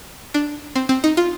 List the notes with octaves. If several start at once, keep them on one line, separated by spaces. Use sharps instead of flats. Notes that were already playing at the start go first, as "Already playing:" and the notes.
D4
C4
C4
D#4
F4